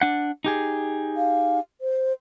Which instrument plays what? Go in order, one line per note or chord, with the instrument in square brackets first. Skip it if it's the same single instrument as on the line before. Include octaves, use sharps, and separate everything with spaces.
[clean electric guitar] D4 F#5
D#4 G4 G#4
[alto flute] F5
C5